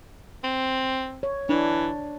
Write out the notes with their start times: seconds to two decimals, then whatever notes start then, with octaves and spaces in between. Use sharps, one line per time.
0.44 C4
1.23 C#5
1.49 E3 D4